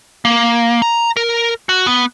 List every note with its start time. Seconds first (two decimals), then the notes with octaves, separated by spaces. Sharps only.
0.25 A#3
0.82 A#5
1.17 A#4
1.69 F#4
1.87 B3